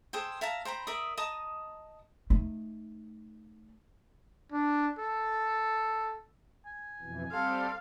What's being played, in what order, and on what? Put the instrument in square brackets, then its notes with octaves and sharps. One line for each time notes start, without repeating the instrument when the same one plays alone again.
[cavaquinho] G#4 A4 C5 G5
E5 F5 A5 A#5
C5 G5 A#5 B5
A#4 D5 E5 D#6
D#5 A5 A#5 D#6
[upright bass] A3 D#4
[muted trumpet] D4
A4
[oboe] G#5
[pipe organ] F2 B2 E3
[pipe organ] G3 C4 G4 [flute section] A4 C6 [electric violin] F5